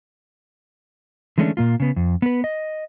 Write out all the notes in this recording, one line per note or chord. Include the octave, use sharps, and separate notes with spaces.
D3 E3 G#3 A3 C#4 D4
A#2 A#3 F4
C#3 B3
F2
B3 B4
D#5